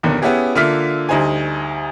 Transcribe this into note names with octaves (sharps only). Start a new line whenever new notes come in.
F#1 D#2 B2 D3
B3 C#4 E4 G4 G#4
D3 A#3 F4 E5 F6 B6
D2 G3 D#4 C5 G#5